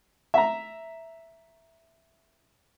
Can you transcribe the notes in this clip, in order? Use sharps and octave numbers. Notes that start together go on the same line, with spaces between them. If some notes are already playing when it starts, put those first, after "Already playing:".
E5 A#5